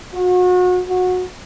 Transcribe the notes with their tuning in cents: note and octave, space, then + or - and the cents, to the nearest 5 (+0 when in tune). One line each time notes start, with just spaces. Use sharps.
F#4 -35
F#4 -20